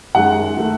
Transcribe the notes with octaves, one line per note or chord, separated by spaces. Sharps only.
F#2 D#3 G#3 F#5
D#3 A3